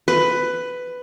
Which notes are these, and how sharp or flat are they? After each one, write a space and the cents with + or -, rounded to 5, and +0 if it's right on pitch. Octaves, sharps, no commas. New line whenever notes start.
B4 +10